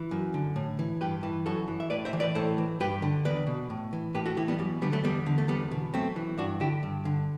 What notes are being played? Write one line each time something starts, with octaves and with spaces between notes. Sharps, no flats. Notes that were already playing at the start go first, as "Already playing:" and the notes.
Already playing: E3
F#2
D3
A2
E3
G2 G4 B4
E3
F#2 F#4 A4
E3
E5
A2 B4 D5
C5 E5
E3
B4 D5
A2 A4 C5
E3
G2 G4 B4
D3
E2 B4 D5
B2
A2
E3
A2 G4 B4
F#4 A4
E3 E4 G4
G3 B3
F#2 G3
D3 G3 B3
F#3 A3
E2 G3 B3
D3
A3
E2 G3 B3
B2
F#2 A3 C4
E3
G2 D4 F#4
D3 E4 G4
G2
D3